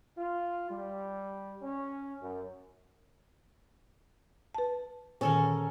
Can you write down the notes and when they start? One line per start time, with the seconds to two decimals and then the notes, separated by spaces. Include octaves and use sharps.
0.18 F4
0.71 G3
1.63 C#4
2.22 F#2
4.55 B4 A5
5.21 A#2 D3 D#3 C#4 A4 A#4